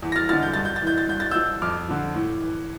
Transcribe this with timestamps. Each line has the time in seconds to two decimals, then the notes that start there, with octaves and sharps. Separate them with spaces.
0.02 E2
0.12 A#6
0.16 F6 A6
0.29 D3 F3 F6 A6
0.43 G6
0.54 G2 A6
0.65 G6
0.76 A6
0.82 E3 G6
0.98 A6
1.09 G2 G6
1.20 A6
1.31 F3 E6 G6
1.62 F2 D6 F6
1.88 D3 F3
2.15 A2
2.41 E3